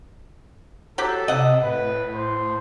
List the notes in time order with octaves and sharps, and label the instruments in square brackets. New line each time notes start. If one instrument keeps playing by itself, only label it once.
[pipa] F#3 G4 [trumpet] A4
[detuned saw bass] C3 [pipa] D#5 F#5
[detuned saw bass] A2 [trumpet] B4
[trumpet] C5